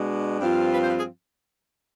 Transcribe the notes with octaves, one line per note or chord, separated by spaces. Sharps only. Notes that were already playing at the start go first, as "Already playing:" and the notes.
Already playing: B2 G#3 D4
G2 F3 C4 F4
B4
C5
B4
G#4